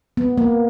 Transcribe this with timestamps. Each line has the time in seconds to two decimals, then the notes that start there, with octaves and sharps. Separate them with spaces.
0.17 B3
0.38 A#3